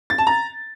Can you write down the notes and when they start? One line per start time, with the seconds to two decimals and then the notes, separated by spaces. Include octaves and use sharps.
0.10 A6
0.18 A5
0.27 A#5